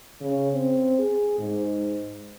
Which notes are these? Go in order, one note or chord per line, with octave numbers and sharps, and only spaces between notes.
C#3
C4
G#4
G#2